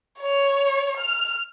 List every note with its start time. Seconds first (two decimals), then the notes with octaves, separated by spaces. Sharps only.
0.19 C#5
0.97 F6